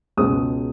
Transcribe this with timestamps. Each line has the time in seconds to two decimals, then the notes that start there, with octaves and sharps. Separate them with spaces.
0.17 C#2 B2 G#3 C#4 D#6